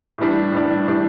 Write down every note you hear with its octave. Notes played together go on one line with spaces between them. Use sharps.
A2 E3 G3 D4
A2 E3 G3 D4
A2 E3 G3 D4